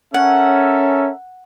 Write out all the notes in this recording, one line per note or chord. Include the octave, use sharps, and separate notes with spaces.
C#4 A4 A#4 E5 F#5